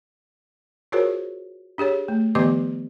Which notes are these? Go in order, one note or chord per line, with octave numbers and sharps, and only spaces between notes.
F4 F#4 G#4 A#4 C5 C#5
D4 G4 G#4 C#5
A3
D#3 F3 B3 G4 D#5 D6